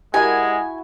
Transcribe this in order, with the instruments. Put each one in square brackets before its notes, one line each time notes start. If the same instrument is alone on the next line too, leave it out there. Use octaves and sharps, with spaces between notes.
[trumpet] G#3 [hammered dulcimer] E4 F#4 [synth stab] G4 A#4 D#5 [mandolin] G#5